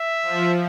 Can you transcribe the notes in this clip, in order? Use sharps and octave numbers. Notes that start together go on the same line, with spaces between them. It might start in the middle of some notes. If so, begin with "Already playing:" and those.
Already playing: E5
F3